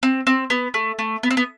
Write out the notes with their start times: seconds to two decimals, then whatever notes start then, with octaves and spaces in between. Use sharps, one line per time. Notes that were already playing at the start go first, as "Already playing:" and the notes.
0.03 C4
0.27 C4
0.50 B3
0.74 A3
0.99 A3
1.23 B3
1.31 C4
1.37 B3